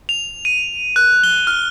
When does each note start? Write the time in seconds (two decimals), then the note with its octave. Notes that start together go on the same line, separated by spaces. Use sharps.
0.09 F7
0.45 D#7
0.96 F#6
1.24 G7
1.47 F6